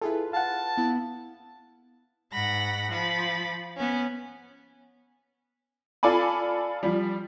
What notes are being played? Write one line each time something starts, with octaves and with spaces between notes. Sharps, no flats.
E4 F4 G#4 A4 B4
F5 F#5 A5
B3 E4
G#2 F#5 B5 A#6
F3 B5 A6
B3 C#4
F4 A4 D5 G#5 B5
F3 G3